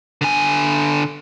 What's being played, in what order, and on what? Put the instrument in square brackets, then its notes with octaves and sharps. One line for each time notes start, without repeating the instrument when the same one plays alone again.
[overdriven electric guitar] D3 G#5